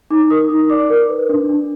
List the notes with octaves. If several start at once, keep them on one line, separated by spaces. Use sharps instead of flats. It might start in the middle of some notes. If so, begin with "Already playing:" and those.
D#4 D6
A#4 D#6
D#4
D5 D6
A#4
B4
D4
D4